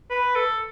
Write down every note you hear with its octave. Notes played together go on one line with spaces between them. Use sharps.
B4
A4